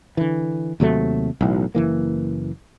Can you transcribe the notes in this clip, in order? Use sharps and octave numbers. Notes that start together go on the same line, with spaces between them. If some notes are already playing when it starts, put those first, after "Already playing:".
D3 E3
D#2 C3 F#3 A3
B1 A2 E3
F#1 E3 A#3